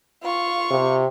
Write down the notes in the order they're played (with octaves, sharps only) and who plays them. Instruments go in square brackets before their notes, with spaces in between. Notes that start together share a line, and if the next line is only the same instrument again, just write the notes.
[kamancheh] F4 C#6
[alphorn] C3